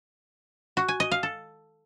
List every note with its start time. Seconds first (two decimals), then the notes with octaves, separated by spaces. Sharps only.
0.77 F#4
0.88 G#5
1.00 D#5
1.11 F5
1.23 A4